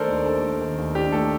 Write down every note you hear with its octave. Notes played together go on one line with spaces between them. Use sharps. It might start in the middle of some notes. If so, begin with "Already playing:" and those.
Already playing: D#3 A3 D4 A4 A#4 C5 D5
D#2
D4 A4
A3
D#3
D#2
D4 G4
A3 A4